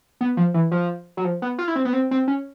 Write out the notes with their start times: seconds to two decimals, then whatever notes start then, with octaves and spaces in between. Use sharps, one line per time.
0.21 B3
0.37 F3
0.54 E3
0.72 F3
1.17 F#3
1.25 F3
1.42 B3
1.59 F4
1.68 E4
1.76 C4
1.85 B3
1.93 C4
2.11 C4
2.28 C#4